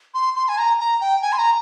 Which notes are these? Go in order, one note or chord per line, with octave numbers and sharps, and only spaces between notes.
C6
C6
G#5
A#5
A#5
G5
G#5
C6
A#5